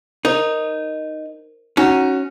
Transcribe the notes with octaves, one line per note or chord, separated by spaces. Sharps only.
D#4 A#4 C5
C#4 D#4 F#4